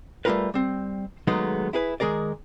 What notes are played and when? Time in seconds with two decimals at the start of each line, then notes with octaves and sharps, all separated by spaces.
0.25 G3 A3 D#4 F4 A#4 B4
0.54 G3 C4
1.27 D#2 F#3 G#3 A3 B3 D#4
1.73 E4 G#4 B4
2.00 D#3 G#3 G#4 A#4 D5